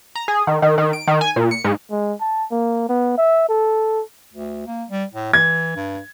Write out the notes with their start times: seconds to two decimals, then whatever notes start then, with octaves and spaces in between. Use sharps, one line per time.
0.15 A#5
0.28 G#4
0.47 D#3
0.62 D#3
0.78 D#3
0.93 D7
1.07 D#3
1.21 G#5
1.36 A#2
1.51 C#7
1.64 G#2
1.91 G#3
2.20 A5
2.51 A#3
2.89 B3
3.18 E5
3.49 A4
4.33 D2
4.67 A#3
4.90 G3
5.14 A2
5.33 E3 G#6
5.76 G2